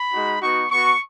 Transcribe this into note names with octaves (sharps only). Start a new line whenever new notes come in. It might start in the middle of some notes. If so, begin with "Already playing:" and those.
Already playing: B5
G#3 D#4 F#4
B3 D#4 F#4 C#6
B3 F#4 C#6